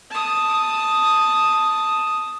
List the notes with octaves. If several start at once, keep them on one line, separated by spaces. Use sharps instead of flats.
A5 D#6